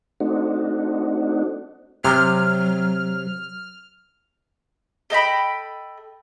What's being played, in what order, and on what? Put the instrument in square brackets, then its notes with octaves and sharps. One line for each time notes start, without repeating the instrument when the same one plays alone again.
[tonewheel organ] A3 C4 D4 D#4 F#4
[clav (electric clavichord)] C3 [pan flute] F#3 [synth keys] F6
[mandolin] A4 D#5 G5 B5